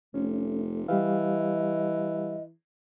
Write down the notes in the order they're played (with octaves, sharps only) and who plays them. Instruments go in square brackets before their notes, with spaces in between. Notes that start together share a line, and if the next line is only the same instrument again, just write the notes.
[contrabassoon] F1 [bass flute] A3 [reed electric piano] C#4
[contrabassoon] E3 [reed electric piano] G3 G4 F5 [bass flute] D#5